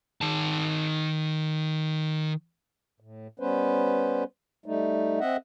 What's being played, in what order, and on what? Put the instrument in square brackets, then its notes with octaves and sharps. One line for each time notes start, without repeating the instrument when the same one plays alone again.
[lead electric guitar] D#3 A5
[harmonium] A2
G3 B3 C#4 B4 C5
G3 A3 D#4
C4 D#5 E5 F#5